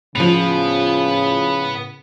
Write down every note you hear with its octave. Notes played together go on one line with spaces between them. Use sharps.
A2 C#3 F3 B3 F7